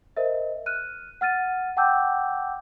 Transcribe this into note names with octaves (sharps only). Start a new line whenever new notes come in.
A#4 C5 D#5 E5
F6 F#6 D#7
F#5 F6 A6 D#7
F#5 G5 A5 D6 E6 G6